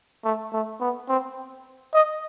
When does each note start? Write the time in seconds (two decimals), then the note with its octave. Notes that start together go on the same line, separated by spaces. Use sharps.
0.25 A3
0.53 A3
0.81 B3
1.09 C4
1.94 D#5